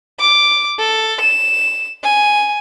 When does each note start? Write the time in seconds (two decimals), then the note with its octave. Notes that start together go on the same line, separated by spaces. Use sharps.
0.20 D6
0.79 A4
1.21 E7
2.04 G#5